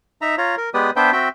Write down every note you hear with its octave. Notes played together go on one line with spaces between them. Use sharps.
D#4 E5 A#5
F4 C#5 A#5
A#4
G#3 B3 G4 B4 D5 D#6
B3 D4 B4 C5 E5 G5
C4 F#4 E5 G5